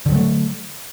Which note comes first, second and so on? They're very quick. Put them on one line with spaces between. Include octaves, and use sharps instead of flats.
D3 D#3 F#3 A3